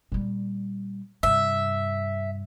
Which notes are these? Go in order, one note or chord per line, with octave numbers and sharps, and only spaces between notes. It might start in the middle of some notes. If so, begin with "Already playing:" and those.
A#2 G3
G2 C3 E5